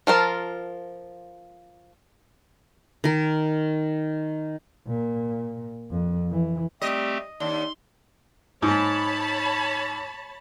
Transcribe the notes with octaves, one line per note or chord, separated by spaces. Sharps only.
F3 F4 A#4 A5
D#3 A#4
A#2
F2
E3
G3 A3 C4 G4 D#5
D#2 D4 C6
G#2 C#5 A5 B5